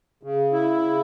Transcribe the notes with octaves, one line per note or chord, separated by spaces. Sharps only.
C#3
E4
C#3